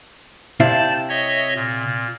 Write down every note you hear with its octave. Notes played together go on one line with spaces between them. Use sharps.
C3 E4 D5 F5 A5 G6
C#5 D#5 E5
A#2